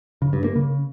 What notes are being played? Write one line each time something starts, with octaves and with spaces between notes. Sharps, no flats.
C#3
G2
A#3
C#3